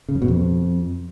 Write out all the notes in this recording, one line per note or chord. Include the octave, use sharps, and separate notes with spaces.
C#3
F#2
B2
F2